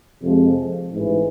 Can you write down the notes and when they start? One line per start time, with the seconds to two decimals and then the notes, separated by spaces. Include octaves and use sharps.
0.21 F2 C3 F3 G#3
0.92 A1 G#2 E3